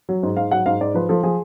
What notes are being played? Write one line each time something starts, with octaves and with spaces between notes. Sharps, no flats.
F#3
G#2
G#2 F5
F#3 F#5
G#2 F5
G#2 D5
F3 B4
F3 A4
F3 G#4